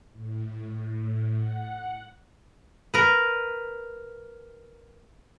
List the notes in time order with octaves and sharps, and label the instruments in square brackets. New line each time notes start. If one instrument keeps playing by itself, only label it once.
[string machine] A2
F#5
[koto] A#4 B4